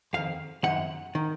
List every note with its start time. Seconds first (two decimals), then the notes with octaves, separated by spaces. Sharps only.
0.13 F2 D#3 F5
0.63 F#2 D#3 F#5
1.15 D#3